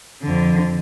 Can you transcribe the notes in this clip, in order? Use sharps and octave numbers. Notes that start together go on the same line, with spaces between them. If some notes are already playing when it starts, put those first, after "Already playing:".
F2 D3